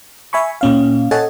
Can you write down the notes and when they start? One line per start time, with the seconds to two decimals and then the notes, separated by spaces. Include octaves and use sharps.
0.33 E5 G#5 B5 C#6
0.61 A#2 C#4 F5
1.11 A4 C#5 D#5 F#5 G#5 A6